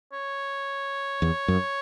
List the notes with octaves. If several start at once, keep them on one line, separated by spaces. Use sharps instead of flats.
C#5
E2
F#2